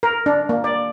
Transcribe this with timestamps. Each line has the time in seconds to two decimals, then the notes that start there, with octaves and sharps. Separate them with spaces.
0.03 A#4
0.26 D4
0.49 A#3
0.64 D5